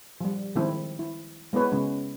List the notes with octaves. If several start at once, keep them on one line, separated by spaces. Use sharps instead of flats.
F3 G3
D#3 F3 G#3 C4 E4
E4
G#3 B3 E4 B4 C#5
C#3 G#3 C#4